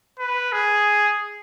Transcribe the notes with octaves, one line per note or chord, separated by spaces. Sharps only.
B4
G#4